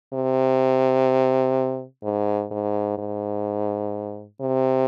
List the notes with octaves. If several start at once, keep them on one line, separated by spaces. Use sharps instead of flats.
C3
G#2
G#2
G#2
C3